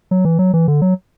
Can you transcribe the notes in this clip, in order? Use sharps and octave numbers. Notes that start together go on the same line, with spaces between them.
F#3
E3
F#3
E3
D3
F#3